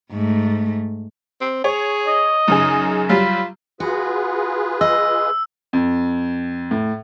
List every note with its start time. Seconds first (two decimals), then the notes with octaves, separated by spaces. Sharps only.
0.12 G#2 A3
1.41 C4
1.64 G#4 C#5
2.07 D#5
2.48 F#2 C#3 D#4 G#4
3.09 F#3 G3 F4 B5
3.80 F4 F#4 G#4 B4
4.81 D#5 E6
5.73 F2
6.71 A2